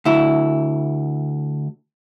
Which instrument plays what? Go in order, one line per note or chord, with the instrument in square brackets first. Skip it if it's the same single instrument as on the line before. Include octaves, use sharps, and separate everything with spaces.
[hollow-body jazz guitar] D2 E4